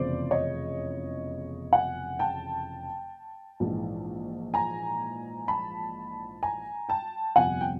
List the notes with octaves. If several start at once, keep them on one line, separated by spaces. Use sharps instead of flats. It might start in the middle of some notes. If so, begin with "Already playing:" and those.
Already playing: F1 E2 C#3 E3 C5 D5
C#5 D#5
F#5 G#5
G5 A5
A#1 G#2 E3
G#5 A#5
A5 B5
G#5 A#5
G5 A5
G1 F2 C3 F#5 G#5
G5